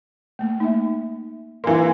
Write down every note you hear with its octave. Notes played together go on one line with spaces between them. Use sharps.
A3 A#3
D#4 E5
E3 A#3 F5 G#5 C6